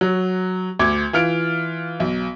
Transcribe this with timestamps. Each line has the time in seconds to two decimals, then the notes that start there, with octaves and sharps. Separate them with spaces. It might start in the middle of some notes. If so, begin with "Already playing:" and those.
0.01 F#3
0.79 D2 D6 G#6
1.13 E3 F4 F6 D7
2.00 B1